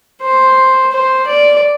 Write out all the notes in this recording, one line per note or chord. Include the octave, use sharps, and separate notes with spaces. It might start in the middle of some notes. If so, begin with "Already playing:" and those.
C5
C5
D5